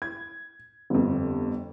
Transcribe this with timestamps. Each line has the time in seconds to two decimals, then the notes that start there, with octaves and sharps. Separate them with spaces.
0.02 G#6
0.90 G1 F2